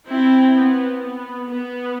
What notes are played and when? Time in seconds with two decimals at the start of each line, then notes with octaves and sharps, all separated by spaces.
0.09 C4 E4
0.55 B3
1.02 B3
1.48 B3